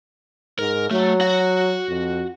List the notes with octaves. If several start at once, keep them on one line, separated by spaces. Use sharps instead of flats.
G#2 A#4
F#3 A3
F#4 F#5
F2